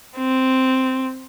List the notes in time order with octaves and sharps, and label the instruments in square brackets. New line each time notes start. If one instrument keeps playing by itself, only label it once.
[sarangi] C4